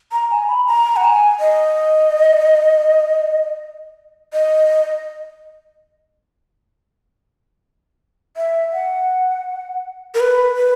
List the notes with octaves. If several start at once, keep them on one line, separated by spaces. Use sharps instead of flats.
A#5
G#5
B5
A#5
F#5
G#5
D#5
D#5
E5
F#5
A#4
B4
B4